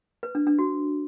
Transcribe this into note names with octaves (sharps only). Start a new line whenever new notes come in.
B4
D4
D4
F#4